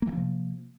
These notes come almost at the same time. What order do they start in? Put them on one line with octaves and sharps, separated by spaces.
A#3 E3 F3 C3